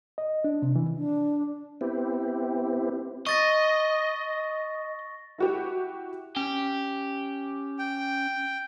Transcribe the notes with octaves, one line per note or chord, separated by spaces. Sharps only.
D#5
D4
C3
E3
D4
B3 C4 E4 G4
D#5 C#6 A6 A#6
E4 F#4 G4
C#4 G4
G5